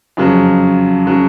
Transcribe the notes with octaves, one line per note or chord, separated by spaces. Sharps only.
F2 C#3 F#3
C#3 F#3